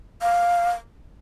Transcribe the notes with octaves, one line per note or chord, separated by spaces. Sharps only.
F5